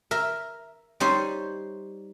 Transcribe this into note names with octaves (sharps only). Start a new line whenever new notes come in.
A#4 E5
G3 D#4 C5 C#5